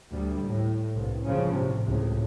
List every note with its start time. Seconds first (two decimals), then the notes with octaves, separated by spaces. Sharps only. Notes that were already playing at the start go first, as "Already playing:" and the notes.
0.13 D2 G3
0.45 A2
0.94 C2 G2
1.23 A#1 G2 C#3 F3 C#4
1.52 A2 C3
1.86 C#2 A2